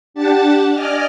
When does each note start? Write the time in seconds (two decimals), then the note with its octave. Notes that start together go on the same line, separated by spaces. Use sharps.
0.14 D4 G4 F#5 A5 A6
0.72 D5 D#5 G#5 D6 F6